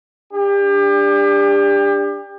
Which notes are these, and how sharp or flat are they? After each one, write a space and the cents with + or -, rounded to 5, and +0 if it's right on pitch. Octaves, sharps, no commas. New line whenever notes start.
D4 +0 G4 +35